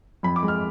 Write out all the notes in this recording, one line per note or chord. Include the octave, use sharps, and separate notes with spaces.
F2 B5
D6
G#3
F6